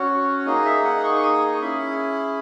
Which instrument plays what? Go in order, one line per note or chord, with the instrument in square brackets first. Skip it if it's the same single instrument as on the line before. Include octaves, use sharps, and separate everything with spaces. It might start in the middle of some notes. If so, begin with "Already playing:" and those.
Already playing: [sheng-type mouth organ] C#4 F#4 C#5
A#3 D#4 G#4 D#5
E5
F#5
C#6
C#6
D#6
C#6
C#4 E4 G#4 B5